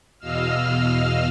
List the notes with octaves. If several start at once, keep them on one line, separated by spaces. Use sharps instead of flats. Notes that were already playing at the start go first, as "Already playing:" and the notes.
E2 B2 D#5 F5 E6 F6